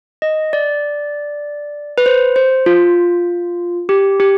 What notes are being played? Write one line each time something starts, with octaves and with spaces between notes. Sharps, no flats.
D#5
D5
B4
C5
C5
F4
G4
G4